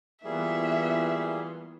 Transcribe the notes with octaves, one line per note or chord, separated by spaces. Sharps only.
E3 G3 A#3 B3 F4 G#4 E5